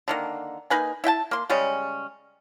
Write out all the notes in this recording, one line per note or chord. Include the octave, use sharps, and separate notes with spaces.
D3 D#3 A#3
A#3 D#4 B4 G#5
E4 E5 G5 A5
A#3 C6
C#3 G3 G#3 C#4